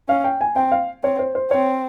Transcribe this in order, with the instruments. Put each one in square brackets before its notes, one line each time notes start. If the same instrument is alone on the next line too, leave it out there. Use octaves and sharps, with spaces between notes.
[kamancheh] C#4 [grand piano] F5
[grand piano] G5
G#5
[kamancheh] C4 [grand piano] G5
[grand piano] F5
[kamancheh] C4 [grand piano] C#5
[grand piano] C5
C5
[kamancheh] C4 [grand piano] C#5